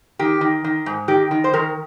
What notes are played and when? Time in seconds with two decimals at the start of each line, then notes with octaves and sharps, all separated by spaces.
0.19 D#3 G4
0.41 D#3
0.64 D#3
0.86 G#2
1.08 D#3 G4
1.31 D#3
1.44 C5
1.53 D#3 A#4